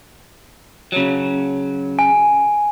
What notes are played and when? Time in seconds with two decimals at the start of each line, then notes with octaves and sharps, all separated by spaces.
0.92 C#3 F#3
1.99 G#5